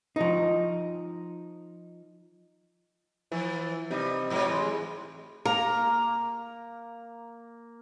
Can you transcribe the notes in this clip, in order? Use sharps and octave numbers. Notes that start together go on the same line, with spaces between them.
F3 D#4
E3 F3
C3 G3 D#4
G#2 F#3 A3
E3 G#3
A#3 A#5